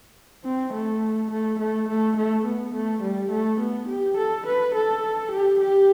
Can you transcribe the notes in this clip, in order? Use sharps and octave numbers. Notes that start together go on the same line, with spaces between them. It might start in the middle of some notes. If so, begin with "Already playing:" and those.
C4
A3
A3
A3
A3
A3
B3
A3
G3
A3
B3
G4
A4
B4
A4
G4
G4